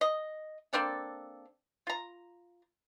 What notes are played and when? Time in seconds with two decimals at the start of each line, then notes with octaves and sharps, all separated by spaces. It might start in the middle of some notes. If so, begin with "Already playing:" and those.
0.01 D#5
0.73 A#3 C4 D4 A4
1.87 F4 A#5